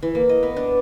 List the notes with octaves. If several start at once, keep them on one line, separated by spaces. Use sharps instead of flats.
E3
A#3
D#5
B3
D4